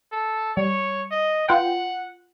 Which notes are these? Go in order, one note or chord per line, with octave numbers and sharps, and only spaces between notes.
A4
G3 C#5
D#5
F4 B4 F#5 G5